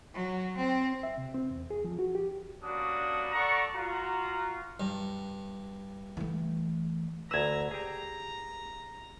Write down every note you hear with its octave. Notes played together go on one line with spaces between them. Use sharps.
F#3
C4
E5
C3
C4
E2
G#4
F3
F#4
G4
G3 A#3 C#4 D4 F#4 D#6
A4 D5 F#5 A#5 C#6
F4 F#4 A#5
G2
E3 A3
D2 B4 A#5 E6 G#6
G4 G#4 A#5